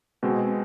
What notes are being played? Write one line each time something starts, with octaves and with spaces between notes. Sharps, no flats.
B2 G#3 C4